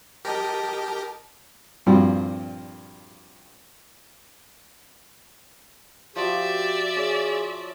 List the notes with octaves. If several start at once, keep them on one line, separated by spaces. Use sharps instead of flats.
G4 A#4 D#5 A5
G2 A#2 F3 G3 C4 F#4
F3 F#4 G4 D5 E5
C#4 G#4